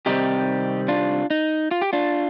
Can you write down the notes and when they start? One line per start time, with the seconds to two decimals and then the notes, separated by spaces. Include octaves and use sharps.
0.06 C3 D#3 G3 C4 D#4 G4
0.88 D4 F4
1.30 D#4
1.71 F4
1.82 G4
1.93 D4 F4